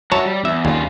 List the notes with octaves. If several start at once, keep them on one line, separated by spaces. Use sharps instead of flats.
F#3 F#4 C#5 E5 A5 A#5
G3
E2 E5
D#2 C#3 G3 F4